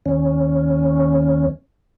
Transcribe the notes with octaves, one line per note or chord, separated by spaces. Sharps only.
D#2 C#4